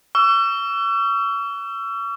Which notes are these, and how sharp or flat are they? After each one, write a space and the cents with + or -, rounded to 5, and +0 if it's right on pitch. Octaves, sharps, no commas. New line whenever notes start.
C#6 +35 E6 +40